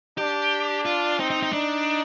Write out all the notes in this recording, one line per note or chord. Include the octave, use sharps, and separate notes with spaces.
D4 G4
F4
C4 D#4
D#4
D#4
D4 D#4